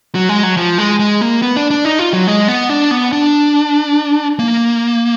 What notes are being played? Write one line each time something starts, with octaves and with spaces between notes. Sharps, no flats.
F#3
G#3
F#3
F3
G#3
G#3
A#3
B3
D4
D4
D#4
F4
F#3
G#3
B3
D4
B3
D4
A#3